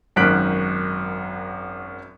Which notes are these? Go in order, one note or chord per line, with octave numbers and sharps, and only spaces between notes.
G#1 F#2 D#3 F#6 B6 D7